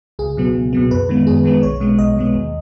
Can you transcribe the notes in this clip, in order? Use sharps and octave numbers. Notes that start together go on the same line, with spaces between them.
C#2 G#4
B2 F#3 B3
C#2
B2 F#3 B3
F#2 B4
D#3 G#3 B3
F#2 G#4
D#3 G#3 B3
B1 C#5
B2 G#3 B3
B1 D#5
B2 G#3 B3
D#2